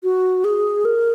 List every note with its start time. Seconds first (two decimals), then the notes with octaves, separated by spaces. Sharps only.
0.03 F#4
0.44 G#4
0.85 A#4